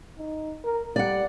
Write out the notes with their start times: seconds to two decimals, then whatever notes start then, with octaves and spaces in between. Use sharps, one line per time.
0.18 D#4
0.64 A#4
0.96 G3 D5 F#5